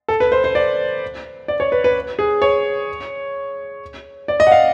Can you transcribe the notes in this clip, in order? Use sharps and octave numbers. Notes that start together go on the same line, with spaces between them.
A4
B4
C5
C5
D5
D5
C#5
B4
B4
G#4
C#5
D5
D#5
F#5
F5